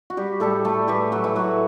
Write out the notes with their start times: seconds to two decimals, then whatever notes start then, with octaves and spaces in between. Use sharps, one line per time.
0.10 F#4
0.17 G3 G4
0.40 A2 G3 A4
0.65 A3 A4
0.88 A2 E3 G3 A3 G4
1.12 F#3 F#4
1.24 E3 E4
1.35 A2 E3 F#3 A3 F#4